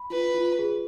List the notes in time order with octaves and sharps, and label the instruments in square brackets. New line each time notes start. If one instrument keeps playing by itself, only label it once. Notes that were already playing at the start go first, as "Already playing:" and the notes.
Already playing: [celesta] B5
[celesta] F4 [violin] B4
[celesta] F4
G#4